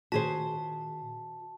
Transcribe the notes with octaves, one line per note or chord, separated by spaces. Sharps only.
A#2 D#3 F#4 G#4 C5 A5 B6